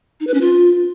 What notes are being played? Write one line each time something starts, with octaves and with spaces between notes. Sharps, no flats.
D#4
B4
C#4
F4